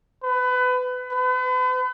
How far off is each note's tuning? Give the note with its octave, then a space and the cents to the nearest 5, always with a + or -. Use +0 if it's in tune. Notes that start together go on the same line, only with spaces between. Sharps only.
B4 +25
B4 +40